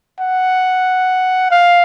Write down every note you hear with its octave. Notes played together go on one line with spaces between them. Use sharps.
F#5
F5